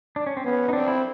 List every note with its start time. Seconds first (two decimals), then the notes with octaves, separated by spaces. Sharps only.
0.16 D4
0.26 C#4
0.37 C4
0.45 B3 C#4
0.69 D#4
0.73 C4 D4
0.88 E4